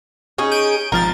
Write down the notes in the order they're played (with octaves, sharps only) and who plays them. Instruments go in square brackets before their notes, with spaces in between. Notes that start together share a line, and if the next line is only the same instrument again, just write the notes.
[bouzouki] C#4 D#4 G#4
[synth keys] G6 D7 D#7
[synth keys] G#1 F3 A6 [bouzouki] A#4